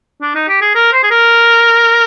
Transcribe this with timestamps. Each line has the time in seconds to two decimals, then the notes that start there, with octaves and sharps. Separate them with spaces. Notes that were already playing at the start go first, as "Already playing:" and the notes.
0.22 D4
0.35 D#4
0.48 G4
0.62 G#4
0.75 A#4
0.93 C5
1.03 G#4
1.11 A#4